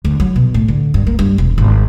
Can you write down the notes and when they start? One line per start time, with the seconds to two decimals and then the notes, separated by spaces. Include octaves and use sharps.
0.05 D2
0.20 F#3
0.36 B2
0.54 A2
0.68 D3
0.94 G2
1.07 A#3
1.19 G2
1.38 E1
1.58 G#1